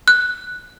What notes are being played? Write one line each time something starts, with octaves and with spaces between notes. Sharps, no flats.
F#6